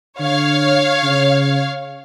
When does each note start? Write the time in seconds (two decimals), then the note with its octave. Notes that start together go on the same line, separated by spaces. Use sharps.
0.20 D3 C#5 F5
1.03 C#3